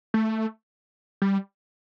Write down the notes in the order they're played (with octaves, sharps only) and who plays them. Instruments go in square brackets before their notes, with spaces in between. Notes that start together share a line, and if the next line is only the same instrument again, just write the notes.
[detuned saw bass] A3
G3